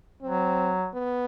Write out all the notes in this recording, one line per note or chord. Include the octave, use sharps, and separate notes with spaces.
F#3 C4
B3